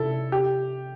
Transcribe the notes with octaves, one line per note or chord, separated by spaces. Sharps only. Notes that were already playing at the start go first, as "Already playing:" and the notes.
Already playing: C3 E4 A4
G4